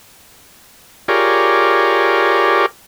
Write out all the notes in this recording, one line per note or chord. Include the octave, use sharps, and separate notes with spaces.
F4 G4 G#4 A#4 C#5 D5